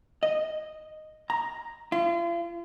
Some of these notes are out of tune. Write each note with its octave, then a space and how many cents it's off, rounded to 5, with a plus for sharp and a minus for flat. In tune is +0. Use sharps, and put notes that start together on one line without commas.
D#5 -5
A#5 +5
F4 -40